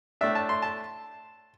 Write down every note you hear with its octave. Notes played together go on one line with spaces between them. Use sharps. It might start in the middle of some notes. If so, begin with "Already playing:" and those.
A2 A3 D4 E5
A5
C6
A5